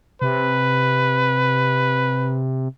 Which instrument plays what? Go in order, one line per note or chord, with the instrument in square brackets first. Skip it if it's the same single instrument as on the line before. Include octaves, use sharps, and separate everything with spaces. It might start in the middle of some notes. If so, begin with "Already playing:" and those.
[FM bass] C3 [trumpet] B4